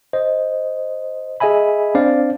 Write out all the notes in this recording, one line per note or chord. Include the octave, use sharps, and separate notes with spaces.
C5 D#5
G#4 D#5 E5 G#5 B5
C4 D4 C5 D5 F5